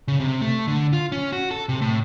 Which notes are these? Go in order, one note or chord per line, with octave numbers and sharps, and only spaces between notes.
C#3
C3
A3
D3
F4
C#4
F#4
A4
C3
A2